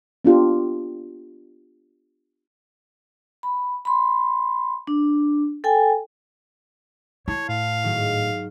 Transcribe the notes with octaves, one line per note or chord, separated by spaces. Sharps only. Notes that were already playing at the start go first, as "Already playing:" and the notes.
B3 D4 F4 G4
B5
B5 C6
D4
A4 G5 G#5
E4 C#5 A5 C6
A2 F5
G#2 D#3 F#3